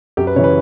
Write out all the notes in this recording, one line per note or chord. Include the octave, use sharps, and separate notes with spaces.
F#2 G4
B4
C#3 E3 C#5
B4